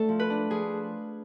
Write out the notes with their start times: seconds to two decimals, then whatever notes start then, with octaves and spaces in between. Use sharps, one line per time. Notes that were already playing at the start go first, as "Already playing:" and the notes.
Already playing: A3 D4 A4
0.09 F3
0.20 B4
0.30 D4
0.50 F3 G#4